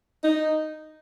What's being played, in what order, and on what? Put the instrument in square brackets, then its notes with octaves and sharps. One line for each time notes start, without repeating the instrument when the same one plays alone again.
[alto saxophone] D#4